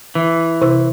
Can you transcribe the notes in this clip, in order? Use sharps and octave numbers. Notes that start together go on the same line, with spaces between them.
E3
C3 E4 C5 E6